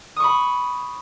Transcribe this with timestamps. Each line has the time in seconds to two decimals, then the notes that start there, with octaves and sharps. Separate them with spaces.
0.16 D#6
0.20 C#6
0.24 B5